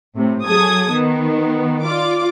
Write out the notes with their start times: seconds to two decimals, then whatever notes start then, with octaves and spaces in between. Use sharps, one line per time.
0.16 A2 C3
0.46 F#3 G#4 A4 D#6 G#6
0.92 D#3 B3
1.84 F4 D5 D6